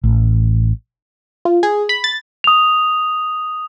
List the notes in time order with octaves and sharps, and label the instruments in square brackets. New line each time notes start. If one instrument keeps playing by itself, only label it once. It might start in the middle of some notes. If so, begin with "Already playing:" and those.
[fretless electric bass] A1
[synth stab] F4
G#4
B5
A6
[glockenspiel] D#6 F7